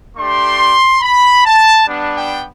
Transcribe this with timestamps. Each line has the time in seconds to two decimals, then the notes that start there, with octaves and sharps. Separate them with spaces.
0.17 A3 D4 G4 C6
1.02 B5
1.45 A5
1.87 G3 B3 D4
2.16 G5